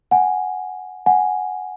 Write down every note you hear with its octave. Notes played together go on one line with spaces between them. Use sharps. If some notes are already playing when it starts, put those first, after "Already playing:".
F#5 G#5
F#5 G#5